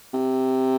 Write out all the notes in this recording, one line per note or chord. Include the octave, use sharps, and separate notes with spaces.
C3